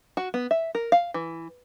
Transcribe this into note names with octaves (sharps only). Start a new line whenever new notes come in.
F#4
B3
E5
A#4
F5
E3